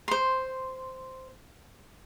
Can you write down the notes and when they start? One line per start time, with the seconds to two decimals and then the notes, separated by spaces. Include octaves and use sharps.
0.08 C5 C6